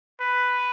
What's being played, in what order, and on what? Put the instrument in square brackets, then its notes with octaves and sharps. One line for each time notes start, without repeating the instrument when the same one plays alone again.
[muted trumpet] B4